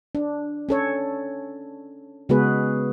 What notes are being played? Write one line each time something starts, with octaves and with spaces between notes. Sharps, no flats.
D4
C#4 A4 C#5
C#3 G#3 B3 F#4 G#4 B4